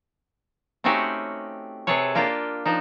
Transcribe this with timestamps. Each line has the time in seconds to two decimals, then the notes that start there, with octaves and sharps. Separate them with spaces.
0.84 A3 C4 C#4 D#4 F#4 G4
1.87 C3 G#4 A4 B4 C#5
2.15 A#3 D4 F4 G4
2.66 F3 D4 D#4